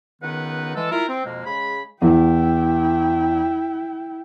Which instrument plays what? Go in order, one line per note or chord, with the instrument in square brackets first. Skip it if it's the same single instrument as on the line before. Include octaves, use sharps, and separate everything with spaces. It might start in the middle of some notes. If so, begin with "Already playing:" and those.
[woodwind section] C#2 D#3 B3 D#4 B4 F#5
E3 G#3 A4
E4 F4 A#4
C4
F2 B2 G#3 A#3
C#3 G#3 G#4 B5
[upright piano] E2 [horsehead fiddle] E4 G5